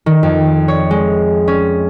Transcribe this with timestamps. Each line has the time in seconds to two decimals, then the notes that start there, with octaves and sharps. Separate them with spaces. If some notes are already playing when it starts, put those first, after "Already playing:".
0.06 D#3
0.23 F2
0.68 C#5
0.91 G#3
1.48 C#4